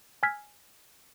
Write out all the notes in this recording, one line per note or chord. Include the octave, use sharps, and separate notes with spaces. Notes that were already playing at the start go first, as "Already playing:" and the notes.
G#5 E6 F6 G#6 B6